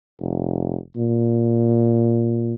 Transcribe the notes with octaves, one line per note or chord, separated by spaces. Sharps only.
F1
A#2